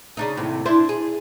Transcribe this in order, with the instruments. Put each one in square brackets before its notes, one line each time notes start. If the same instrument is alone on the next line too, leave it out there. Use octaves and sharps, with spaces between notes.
[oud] C#3 D4 D#4
D#2 A2 C3
D4 E4 C5
G#4